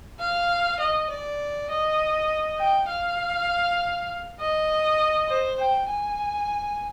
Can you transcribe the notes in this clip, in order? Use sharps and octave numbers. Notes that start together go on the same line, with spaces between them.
F5
D#5
D5
D#5
G5
F5
D#5
C5
G5
G#5